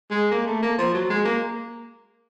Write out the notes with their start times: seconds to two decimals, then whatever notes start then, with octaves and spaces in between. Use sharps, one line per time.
0.10 G#3
0.31 A#3
0.47 A3
0.62 A#3
0.78 F3
0.94 F#3
1.09 G#3
1.25 A#3